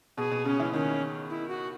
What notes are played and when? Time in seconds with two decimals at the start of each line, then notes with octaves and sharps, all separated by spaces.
0.17 B2 G#4
0.31 B2
0.45 C#3 C#4
0.60 E3
0.73 D#3 C#4
1.30 E4
1.49 F#4